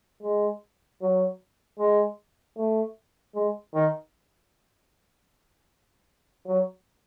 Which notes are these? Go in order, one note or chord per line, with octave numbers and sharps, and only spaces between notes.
G#3
F#3
G#3
A3
G#3
D#3
F#3